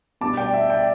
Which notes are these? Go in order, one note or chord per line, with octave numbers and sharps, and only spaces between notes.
B2 G3 D4 A5 D6
D5 G5
E5
D5 G5